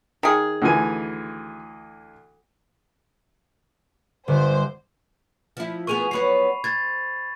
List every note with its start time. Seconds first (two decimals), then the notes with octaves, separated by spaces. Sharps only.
0.23 D#3 G#4
0.62 D2 E3 G#5
4.28 G1 C5
5.57 F3 E4
5.87 B3 G#4 A#4 C#6 D#7 F7
6.11 F#3 B3 C#5 B5 C7
6.64 C5 G#6 A6